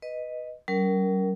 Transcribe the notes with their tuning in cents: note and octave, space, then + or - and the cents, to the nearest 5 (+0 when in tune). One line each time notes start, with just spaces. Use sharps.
B4 +0 D#5 +0
G3 -45 C#4 +25 A#4 +0